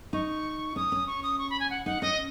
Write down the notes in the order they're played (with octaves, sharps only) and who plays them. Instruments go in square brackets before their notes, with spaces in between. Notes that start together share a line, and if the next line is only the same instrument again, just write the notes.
[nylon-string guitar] D#4 [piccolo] C#6
[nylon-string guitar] C#4 [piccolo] D#6
[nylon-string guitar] C#4
[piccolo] C#6
D#6
C#6
B5
G#5
F#5
[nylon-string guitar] D#4 [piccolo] F#5
[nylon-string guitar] C#4 [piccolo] D#5